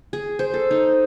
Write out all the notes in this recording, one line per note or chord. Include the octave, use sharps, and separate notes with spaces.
G#4
C5
A4
D#4